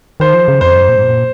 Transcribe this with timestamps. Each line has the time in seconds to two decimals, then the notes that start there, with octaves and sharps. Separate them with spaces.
0.20 D#3 C5
0.34 F3
0.48 C#3
0.61 F2 C5
0.75 F#2
0.89 A#2
0.96 G#2
1.02 A#2